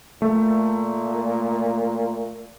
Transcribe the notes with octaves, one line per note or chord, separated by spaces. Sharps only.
A#2 A3